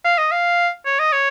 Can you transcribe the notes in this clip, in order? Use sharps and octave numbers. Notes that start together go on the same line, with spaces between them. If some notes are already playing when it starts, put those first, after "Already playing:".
F5
D#5
F5
C#5
D#5
C#5